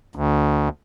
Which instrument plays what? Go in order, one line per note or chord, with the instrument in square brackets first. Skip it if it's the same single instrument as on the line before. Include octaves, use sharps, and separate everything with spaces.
[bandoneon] D2